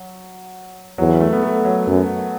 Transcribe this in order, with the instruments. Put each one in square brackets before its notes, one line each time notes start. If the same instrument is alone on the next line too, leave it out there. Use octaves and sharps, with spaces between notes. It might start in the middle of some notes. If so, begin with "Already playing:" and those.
Already playing: [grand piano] F#3
[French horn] E2 [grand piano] F#3
[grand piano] A3
B3
A3
F#3
[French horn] F#2